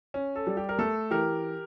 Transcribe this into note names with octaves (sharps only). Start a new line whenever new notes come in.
C#4
A4
G3
G4
A#4
A3 A4
E3 G4 A#4